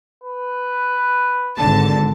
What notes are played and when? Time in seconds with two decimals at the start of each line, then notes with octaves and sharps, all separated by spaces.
0.24 B4
1.56 G#1 D3 A5